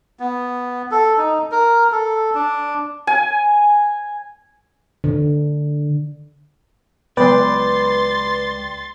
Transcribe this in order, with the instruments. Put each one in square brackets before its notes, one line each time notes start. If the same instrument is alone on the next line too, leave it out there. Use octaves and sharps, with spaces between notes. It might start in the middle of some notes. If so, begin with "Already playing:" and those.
[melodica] B3
A4
D#4
A#4
A4
D4
[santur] G#5
[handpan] D3
[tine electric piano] C#2 D5 G5 [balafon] F#3 B3 [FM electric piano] B4 [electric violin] C6 A6